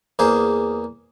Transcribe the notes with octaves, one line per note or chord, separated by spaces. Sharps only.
E2 A#3 G#4 C5